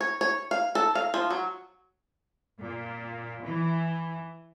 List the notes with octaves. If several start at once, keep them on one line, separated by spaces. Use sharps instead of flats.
C#5
C#5
F5
A4
F5
F3
F#3
A#2
E3